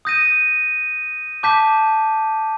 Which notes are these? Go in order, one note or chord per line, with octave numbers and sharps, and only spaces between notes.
D#6 G6 A#6 D#7
A5 D6 G6 B6